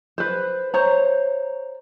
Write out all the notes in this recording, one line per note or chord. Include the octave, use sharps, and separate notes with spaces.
B4 C5
C5 C#5 A#5